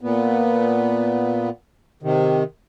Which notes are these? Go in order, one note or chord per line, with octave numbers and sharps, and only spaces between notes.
A#2 B3
C3 D#3